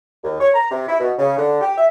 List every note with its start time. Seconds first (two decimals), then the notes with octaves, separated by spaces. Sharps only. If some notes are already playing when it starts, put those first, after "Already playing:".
0.24 D#2
0.39 C#5
0.54 A#5
0.70 C3
0.88 E4
1.00 B2
1.18 C#3
1.38 D3
1.61 G4
1.77 E5